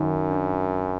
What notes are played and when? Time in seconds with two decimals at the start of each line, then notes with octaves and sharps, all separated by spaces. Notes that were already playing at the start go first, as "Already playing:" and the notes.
Already playing: F#2 D#3
0.31 D4